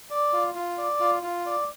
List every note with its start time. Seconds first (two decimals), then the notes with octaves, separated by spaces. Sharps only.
0.10 D5
0.33 F4
0.55 F4
0.78 D5
1.00 F4
1.23 F4
1.46 D5